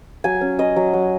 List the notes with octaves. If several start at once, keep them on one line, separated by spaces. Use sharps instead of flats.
F#3 G#5
C#4
C#4 D#5
F#3
F#3